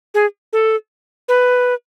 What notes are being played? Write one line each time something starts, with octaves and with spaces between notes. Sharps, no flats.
G#4
A4
B4